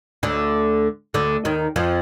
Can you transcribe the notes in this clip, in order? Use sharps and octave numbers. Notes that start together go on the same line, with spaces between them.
D2 D3
D2 D3
D#2 D#3
F2 F3